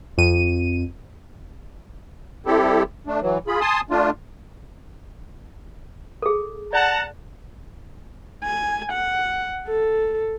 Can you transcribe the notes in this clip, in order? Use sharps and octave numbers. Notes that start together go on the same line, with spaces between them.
F2 D#7
G3 C4 E4 G4 A4
A3 D4
E3 F#3
F4 G#4 B5
G#5 A5 C6 D#6
A3 D4 F4
G#4 A4
D5 F#5 A5 A#5
G#5
F#5
A4